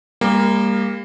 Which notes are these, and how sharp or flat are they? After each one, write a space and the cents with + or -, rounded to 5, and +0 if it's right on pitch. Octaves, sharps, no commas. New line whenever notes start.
G3 +35 A#3 +0